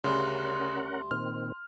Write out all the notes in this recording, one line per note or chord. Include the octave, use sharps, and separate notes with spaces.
D2 C#3 G3 C#4 A#4 D5 F#5 C6
A#2 D#3 C4 F6